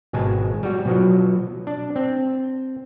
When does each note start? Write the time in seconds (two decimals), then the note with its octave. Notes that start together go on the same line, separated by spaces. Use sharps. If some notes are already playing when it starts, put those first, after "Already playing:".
0.13 G#1 B2 G#3 G#5 A5
0.63 G3 F#4
0.85 B2 F3 F#3
1.67 D4
1.96 C4